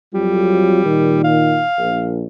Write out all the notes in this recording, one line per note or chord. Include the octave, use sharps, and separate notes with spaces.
F2 F#3 G3 F4
A#2 D#3
F5
A#1